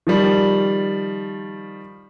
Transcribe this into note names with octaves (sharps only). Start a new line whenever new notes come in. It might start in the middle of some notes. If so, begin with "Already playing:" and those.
D#3 F3 G3